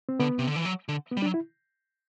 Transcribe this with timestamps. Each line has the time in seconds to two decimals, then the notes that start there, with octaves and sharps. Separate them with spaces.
0.09 C4
0.20 D3 B3
0.39 C3
0.47 D3
0.56 E3
0.65 F#3
0.89 D3
1.11 B3
1.17 G3
1.22 D4
1.26 F#3
1.34 E4